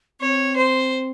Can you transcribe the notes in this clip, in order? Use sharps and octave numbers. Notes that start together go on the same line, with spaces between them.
C4 C#5
C5